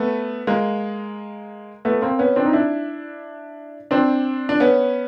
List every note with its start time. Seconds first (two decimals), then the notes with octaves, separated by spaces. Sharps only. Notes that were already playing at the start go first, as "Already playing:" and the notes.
Already playing: A3 B3
0.47 G#3 A#3
1.85 A3 B3
2.02 A#3 C4
2.19 B3 C#4
2.36 C4 D4
2.46 D#4
2.53 D4 E4
3.91 C4 D4
4.49 D4
4.60 B3 C#4